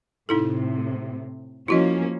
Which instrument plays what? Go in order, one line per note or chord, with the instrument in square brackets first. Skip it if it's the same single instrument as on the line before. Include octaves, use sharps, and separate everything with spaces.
[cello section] A2 C3 [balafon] D#4 E4 A4
[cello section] F3 A#3 C#4 [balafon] E4 F#4 D#5